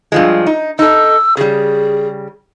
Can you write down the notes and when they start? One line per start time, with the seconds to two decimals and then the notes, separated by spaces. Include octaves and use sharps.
0.12 G2 F3 G#3
0.46 D#4
0.79 D#4 A4 E6
1.37 C#3 G3 G#4